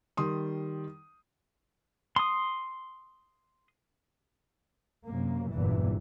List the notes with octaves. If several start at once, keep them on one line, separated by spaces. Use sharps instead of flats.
D#3 G3 C6 D#6
C6 D#6
F#2 C3 A#3
F#1 E2 G2 A#2 E3